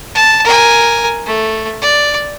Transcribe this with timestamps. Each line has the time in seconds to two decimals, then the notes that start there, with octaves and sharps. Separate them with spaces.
0.15 A5
0.45 A#4 G#5
1.26 A3
1.82 D5